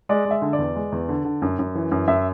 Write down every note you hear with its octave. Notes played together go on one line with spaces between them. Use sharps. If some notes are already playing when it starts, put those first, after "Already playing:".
G#3 D5
G#3
E5
D3
D5
E2
G#3
E2
D3
D3
F#2
F#2
E3
F#2
F#2 E5